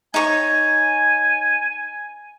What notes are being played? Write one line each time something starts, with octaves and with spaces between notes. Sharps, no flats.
D#4 C#5 G#5